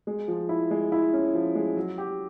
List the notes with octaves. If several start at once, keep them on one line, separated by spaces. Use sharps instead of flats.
G#3
F3
E4
G#3
E4
C#4
F3
G#3
F#3
G4